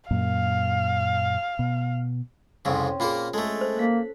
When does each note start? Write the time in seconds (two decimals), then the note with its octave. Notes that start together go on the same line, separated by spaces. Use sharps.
0.11 F#2 A#2 F5
1.59 B2
2.65 C2 F2 C#3 C4 C#4
3.00 A#2 A#3 F4 G#4 A#4
3.34 G#3 A3 A4
3.61 C5
3.76 A#3 F#6 B6